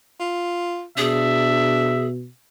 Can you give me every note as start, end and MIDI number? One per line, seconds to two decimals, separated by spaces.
0.20 0.85 65
0.98 2.27 47
0.98 1.97 62
0.98 2.06 68
0.98 2.10 76